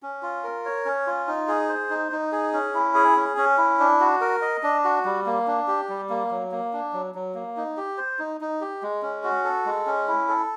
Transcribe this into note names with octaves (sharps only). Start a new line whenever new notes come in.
C#4
F4
A#4
C#5
C#4
F4
D#4
G#4
C5
D#4
D#4
G#4
C#4
E4
G#4
C#4
C#4
E4
D4
F#4
A#4
D#5
D4
F#4
G3
A#3
D4
G4
G3
A#3
F#3
A#3
D4
F#3
F#3
A#3
D#4
G4
C5
D#4
D#4
G4
G#3
C#4
F#4
A4
G#3
C#4
E4
A4